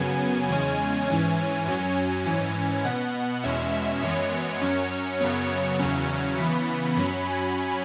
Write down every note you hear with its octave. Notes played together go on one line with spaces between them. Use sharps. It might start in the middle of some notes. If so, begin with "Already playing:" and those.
Already playing: F#2 C#3 F#3 B3 G#5
E2 C#3 G#3 C#4 G#5
G#2 E3 C#4
F#2 F#3 C#4
G#2 E3 C#4
B2 B3 F#5
E2 B2 G#3 C#4 E5
E5
F#2 E3 G#3 B3 C#5
F#2 F#3 C#4
F#2 C#3 F#3 B3 C#5
E2 C#3 F#3 C#4
C#3 E3 B3 B5
F#2 F#3 C#4 B5
G#5